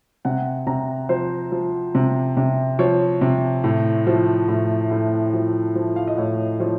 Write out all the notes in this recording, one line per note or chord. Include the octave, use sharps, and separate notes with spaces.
C3 F#5
C3 A#5
F3 C5
F3
C3
C3
F3 C#5
C3
A2
F3
A2
A2
F3
F3
F5
D#5
A2 C#5
F3 C#5